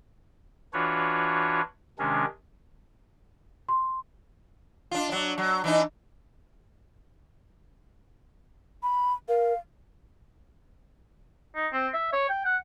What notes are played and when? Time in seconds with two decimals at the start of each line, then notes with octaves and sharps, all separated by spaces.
0.73 E3 D4 F4 F#4 B4 C#5
1.99 C3 D#3 G#3 C#4 D4
3.69 C6
4.91 D4 F4
5.09 F#3 D4
5.38 F#3
5.64 E3 D4 D#4
8.83 B5
9.28 A#4 F5
11.55 D#4
11.73 C4
11.93 E5
12.13 C#5
12.29 G5
12.45 F#5